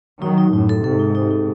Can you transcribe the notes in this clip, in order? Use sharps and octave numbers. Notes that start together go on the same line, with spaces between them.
D#3 F#3 D#4
D#4
F#2 A2 D#4
A4
G#2 C3 A4
D#4
D#4
D#4